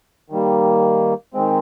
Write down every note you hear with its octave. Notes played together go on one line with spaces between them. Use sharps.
D#3 G3 A#3
D#3 G#3 C4